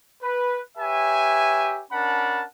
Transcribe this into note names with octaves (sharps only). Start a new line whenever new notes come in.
B4
G4 B4 C#5 E5 G#5
C#4 D4 A#4 F#5 A5 B5